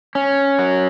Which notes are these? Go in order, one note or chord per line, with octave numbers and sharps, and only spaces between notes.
C#4
F#3